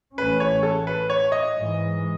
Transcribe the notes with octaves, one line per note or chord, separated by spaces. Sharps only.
A1 A2 E3 A3 C#4 B4
C#5
A4
B4
C#5
D#5
G#2 E3 G#3